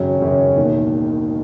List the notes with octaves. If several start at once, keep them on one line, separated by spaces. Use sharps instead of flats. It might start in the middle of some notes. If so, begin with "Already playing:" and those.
Already playing: G#1 F#2 C#3 F#3 C#4
G#1 F#2 C#3 F#3 C#4
E1 D#2 D#3